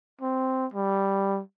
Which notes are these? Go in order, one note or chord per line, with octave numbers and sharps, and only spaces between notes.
C4
G3